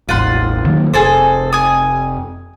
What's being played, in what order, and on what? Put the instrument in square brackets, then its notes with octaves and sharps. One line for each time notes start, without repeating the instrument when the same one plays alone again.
[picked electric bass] E1 A1 [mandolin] F4 F#5 C6
[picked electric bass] D#3 F#3 A#3
[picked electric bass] F1 [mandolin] G#4 A4 C5
[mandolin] G#5 D#6